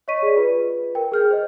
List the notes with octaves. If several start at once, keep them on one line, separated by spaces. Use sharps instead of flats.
C#5 D#5 C#6 B6 D#7
G#4 D5
F4 B4
A#4 G5
G#4 F6 G6
C5 D#5